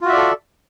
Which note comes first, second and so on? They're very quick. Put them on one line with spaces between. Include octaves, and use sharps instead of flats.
F4 F#4 E5 D5 A4